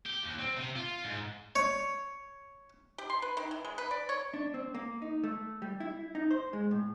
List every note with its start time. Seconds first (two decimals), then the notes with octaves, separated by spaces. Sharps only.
0.06 G4
0.23 D#2
0.39 C4
0.57 C3
0.76 F4
1.04 G#2
1.56 C#5
2.98 G4
3.10 C6
3.22 B4
3.37 D#3
3.51 E3
3.65 G#3
3.78 B4
3.91 D5
4.09 C#5
4.34 D4
4.54 C4
4.74 A#3
5.02 D#4
5.24 A3
5.62 G3
5.80 E4
6.15 D#4
6.31 C5
6.53 G#3
6.71 A2